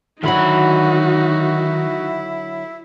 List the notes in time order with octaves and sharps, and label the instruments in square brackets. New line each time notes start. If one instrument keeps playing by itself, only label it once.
[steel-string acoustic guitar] D3 F#3 [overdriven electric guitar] D#3 B5 [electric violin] D#4 F#4 [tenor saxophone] E4